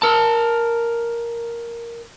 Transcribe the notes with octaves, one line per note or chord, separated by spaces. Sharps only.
A#4 A5